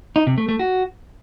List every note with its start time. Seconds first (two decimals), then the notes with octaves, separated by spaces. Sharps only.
0.16 D#4
0.27 C3
0.38 A3
0.49 A3
0.59 F#4